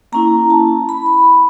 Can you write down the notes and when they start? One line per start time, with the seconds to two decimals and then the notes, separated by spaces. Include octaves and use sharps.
0.12 A#3 C#4 E4 A#5
0.50 A5
0.89 B5
1.06 B5